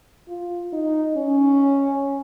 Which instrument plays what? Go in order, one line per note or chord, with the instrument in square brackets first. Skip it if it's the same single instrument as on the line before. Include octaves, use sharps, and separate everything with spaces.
[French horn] F4
D#4
C#4